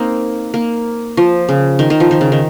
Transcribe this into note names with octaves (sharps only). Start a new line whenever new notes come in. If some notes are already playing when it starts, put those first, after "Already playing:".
Already playing: A#3 C4 D#4
A#3
F3
C#3
D#3
D#3
F3
D#3
C#3
D#3